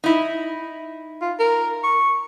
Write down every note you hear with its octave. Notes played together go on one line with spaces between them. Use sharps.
D#4 E4
F4
A#4
C#6